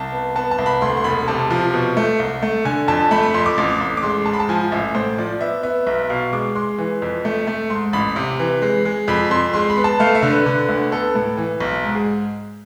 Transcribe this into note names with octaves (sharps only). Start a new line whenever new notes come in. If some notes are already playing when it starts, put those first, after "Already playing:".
Already playing: C2 A5
B3
B3 A5
A5
C2
B5
D2 C6
C6
E1 B5
C3 A5
F3
B2
A3
C2
A3
D3 G#5
F2 A5
A3 B5
B5
F2 C6
D6
A1
A1
D6
G#3 C6
G#2 A5
B5
A5
F3 G#5
A1 E5
A2 C5
F3 D5
B3 E5
B3 E5
B1 E5
B2 F5
G#3 D6
G#3 C6
E3
F2
A3
A3
G#2 C6
A1 B5
C3
E3
G#3
G#3
F2 B5
F2 C6
G#3 C6
B5
B3
A5
A3 F5
E5
D3
B4
D3
D2
B3 A4
A2
E3
B1
G#2
G#4